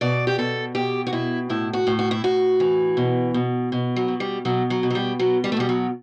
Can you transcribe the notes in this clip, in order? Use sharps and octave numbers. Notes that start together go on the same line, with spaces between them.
B2 D5
G4
B2 A4
B2 G4
F#4
B2 E4
A2 E4
F#4
A2
F#4
E4
A2 F#4
E3
B2
B2
B2
F#3
B2
G3
B2 F#3
F#3
B2
F#3
G3
B2 F#3
G3
A3
B2 G3
F#3